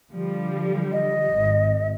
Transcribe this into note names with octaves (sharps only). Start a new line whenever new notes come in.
D3 F3 G3
D#5
G#1